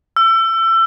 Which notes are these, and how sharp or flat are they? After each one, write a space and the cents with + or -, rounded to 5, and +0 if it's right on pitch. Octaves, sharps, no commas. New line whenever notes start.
E6 +30